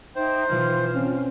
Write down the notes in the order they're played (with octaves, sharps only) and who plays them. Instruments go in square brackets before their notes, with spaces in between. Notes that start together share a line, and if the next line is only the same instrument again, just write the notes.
[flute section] D#4 E5 G5 [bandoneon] C5
[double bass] B2 E3 [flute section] F4 F6
[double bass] C4 C#4